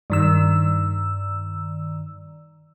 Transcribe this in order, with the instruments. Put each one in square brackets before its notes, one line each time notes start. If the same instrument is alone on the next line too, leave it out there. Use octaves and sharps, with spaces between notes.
[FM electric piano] G2 D#3 E6